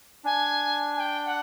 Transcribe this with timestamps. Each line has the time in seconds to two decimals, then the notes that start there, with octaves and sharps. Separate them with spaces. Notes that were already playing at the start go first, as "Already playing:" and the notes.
0.24 D4 G#5
0.95 G#5
1.00 G5
1.25 F#5